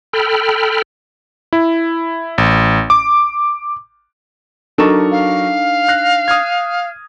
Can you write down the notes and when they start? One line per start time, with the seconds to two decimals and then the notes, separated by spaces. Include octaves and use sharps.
0.13 A4 G5 B5 F6
1.53 E4
2.38 A1
2.90 D6
4.78 F#3 D4 D#4 A4 A#4 C#6
5.11 F5
5.89 F#6 A#6 C7
6.28 D#6 F6 G#6